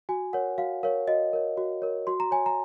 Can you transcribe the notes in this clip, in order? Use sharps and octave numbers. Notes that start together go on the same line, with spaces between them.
F#4 G#5
A#4 C#5 F#5
F#4 F5
A#4 C#5 F5
F#4 D#5
A#4 C#5
F#4
A#4 C#5
F#4 C6
A#5
C#5 G#5
A#5